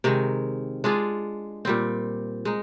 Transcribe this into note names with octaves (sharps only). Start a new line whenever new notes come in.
C3 D#3 G#3
G#3 D4 F4 G#4
A#2 G3 C4
G#3 D#4